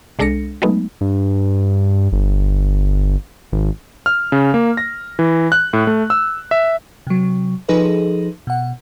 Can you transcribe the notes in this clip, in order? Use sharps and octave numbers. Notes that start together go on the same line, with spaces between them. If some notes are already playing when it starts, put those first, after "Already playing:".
C2 G#3 D4 A4 A#6 C#7
F#3 G#3 A3 B3 D#4
G2
G1
G#1
F6
C#3
A#3
A#6
E3
F#6
A2
A3
E6
E5
C3 F#3
F3 D#4 G#4 A4 B4 D#5
B2 F#5